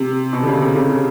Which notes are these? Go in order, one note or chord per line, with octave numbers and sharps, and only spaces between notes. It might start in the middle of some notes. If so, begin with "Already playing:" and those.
Already playing: C3
B2
D3
C#3
C3
C#3
C3